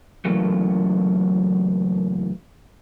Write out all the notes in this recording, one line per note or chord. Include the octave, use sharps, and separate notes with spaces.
F#2 C#3 E3 F#3 A3 A#3